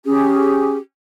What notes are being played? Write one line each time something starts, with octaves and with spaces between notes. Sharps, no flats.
C#4 G4 G#4